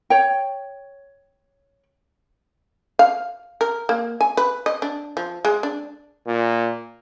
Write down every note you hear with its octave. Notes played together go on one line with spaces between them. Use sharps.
C#5 G5
F5
A#4
A#3
G#5
B4
D#5
D4
F3
G#3
D4
A#2